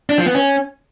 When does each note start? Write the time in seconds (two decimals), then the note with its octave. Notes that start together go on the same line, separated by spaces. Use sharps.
0.10 D4
0.18 F3
0.26 B3
0.35 C#4